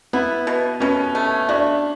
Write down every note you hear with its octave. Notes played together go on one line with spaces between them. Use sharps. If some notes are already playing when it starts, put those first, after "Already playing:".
B3 E4
B2
B2 C#4
A3
D4 F#4